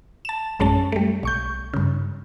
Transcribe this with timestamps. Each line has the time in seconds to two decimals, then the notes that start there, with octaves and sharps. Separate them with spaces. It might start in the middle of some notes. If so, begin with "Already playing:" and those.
0.25 A5 E7
0.60 A#1 F#2 G#3 C#4 A5
0.92 G3 A3
1.23 B1 C#6 G6
1.74 G2 C#3